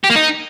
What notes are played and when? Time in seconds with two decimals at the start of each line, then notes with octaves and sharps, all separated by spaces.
0.04 G4
0.10 A#3
0.16 D#4